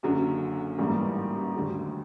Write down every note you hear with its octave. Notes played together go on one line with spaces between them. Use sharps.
F#1 F#2 D3 F#3
A1 G#2 E3 G3 A#3
D#2 D3 F#3 A3